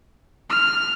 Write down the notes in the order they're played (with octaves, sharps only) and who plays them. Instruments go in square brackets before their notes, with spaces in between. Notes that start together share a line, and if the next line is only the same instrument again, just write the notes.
[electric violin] F6